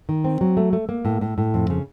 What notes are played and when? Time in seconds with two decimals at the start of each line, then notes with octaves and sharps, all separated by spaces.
0.09 D#3
0.24 C4
0.41 F#3
0.57 A3
0.73 A3
0.89 A#3
1.05 A2
1.21 A2
1.38 A2
1.54 F2
1.70 C#3